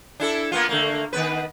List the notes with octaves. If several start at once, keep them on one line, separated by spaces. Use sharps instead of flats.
D4 E4 A4
A#3 B3 F4
D3 A3 A#3
D#3 B3 B4